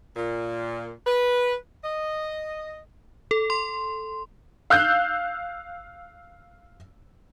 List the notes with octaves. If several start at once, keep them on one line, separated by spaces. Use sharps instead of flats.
A#2
B4
D#5
A4
C6
F5 E6 F#6 G6